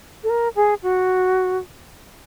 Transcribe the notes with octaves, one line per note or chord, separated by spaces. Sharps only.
A4
A#4
G#4
F#4